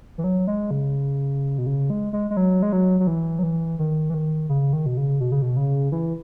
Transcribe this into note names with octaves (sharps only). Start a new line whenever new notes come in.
E3
F#3
G#3
C#3
B2
C#3
G#3
G#3
G#3
F#3
G#3
F#3
F#3
E3
F#3
E3
D#3
E3
D#3
C#3
D#3
B2
C#3
B2
C#3
B2
C#3
E3